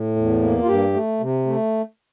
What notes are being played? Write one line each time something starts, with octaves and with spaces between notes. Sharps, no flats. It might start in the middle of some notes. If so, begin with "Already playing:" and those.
Already playing: A2
E2
A#3
F4
G2 G4
A3
C3
A3